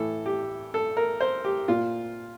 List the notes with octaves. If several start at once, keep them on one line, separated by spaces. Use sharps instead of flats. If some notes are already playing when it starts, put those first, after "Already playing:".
Already playing: A2 E3 A4
G4
A4
A#4
C5
G4
A#2 F4